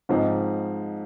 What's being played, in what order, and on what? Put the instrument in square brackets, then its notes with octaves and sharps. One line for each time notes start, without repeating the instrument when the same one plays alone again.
[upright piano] G#2 F3 C4 D#4